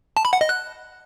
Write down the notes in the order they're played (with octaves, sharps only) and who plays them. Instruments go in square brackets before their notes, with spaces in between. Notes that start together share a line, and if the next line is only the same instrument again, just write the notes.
[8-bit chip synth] A5
B5
F#5
D#5
F#6